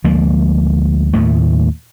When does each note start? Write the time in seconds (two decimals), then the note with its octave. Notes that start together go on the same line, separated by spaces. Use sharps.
0.04 D2 F3 G#3 A#3
1.13 D#2 A2 D#3 A3